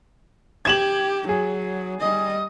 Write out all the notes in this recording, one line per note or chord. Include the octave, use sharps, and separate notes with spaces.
G4 G#6 E7 F#7
F#3 G#4
G3 D#5